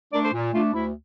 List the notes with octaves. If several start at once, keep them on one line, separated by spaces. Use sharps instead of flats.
A3 D4 A#4 D5
A4 C5
A#2
A3 D4 F4
D2 E4